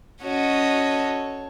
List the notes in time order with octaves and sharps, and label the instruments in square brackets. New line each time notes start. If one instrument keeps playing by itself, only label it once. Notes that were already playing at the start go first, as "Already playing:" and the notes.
[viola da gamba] C#4 F#4 D#5 [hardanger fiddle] A4 C#5